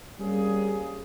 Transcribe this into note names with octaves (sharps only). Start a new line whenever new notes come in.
G3 A#3 C4 C#4 G#4